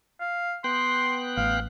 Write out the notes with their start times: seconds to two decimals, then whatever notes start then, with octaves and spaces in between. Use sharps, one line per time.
0.20 F5
0.64 B3 G5 C6 F#6
1.37 A1 F5